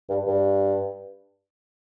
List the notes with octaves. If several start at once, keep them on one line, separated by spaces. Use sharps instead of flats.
G2
G2